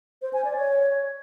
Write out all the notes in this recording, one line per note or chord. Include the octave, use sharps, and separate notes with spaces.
C5
G#5
D5
C#5